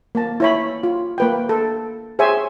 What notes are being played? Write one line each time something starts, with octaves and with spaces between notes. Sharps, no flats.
A#3 A5
E4 C#5 B5
F4
A#3 B4 G5
A4
G#4 C5 C#5 E5 G#5